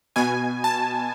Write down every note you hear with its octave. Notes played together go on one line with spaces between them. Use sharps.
B2 G#5
A5